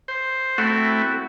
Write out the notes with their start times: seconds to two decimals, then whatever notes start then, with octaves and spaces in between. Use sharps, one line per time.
0.08 C5
0.58 A3 C4 E4 F#4